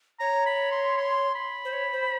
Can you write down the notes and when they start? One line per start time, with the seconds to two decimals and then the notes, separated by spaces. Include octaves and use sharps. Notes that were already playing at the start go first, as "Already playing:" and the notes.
0.20 C#5 A#5
0.46 B5
0.72 C6
0.97 C6
1.35 B5
1.65 C5
1.73 C#5
1.92 C5